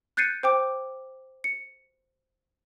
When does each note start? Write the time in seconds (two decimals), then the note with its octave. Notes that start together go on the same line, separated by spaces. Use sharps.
0.17 F#6 G6 A6 C7 C#7 D#7
0.43 C5 G5 D6
1.44 C#7